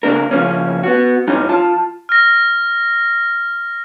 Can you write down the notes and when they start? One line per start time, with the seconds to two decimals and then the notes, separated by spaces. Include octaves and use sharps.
0.03 C#3 A#3 D4 A#4
0.31 C#3 F3 A#3 C#4
0.83 B3 F#4
1.28 E2 G2 E3 C#4 D#4
1.49 F4 A5
2.09 F6 A#6